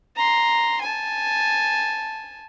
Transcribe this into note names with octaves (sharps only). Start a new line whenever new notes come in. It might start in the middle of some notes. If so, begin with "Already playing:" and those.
A#5 C6
G#5 A5